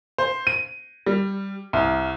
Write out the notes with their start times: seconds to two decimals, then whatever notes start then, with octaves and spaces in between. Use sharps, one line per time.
0.18 C5
0.47 D#7
1.06 G3
1.73 C2